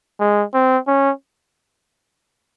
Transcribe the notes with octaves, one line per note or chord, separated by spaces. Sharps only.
G#3
C4
C#4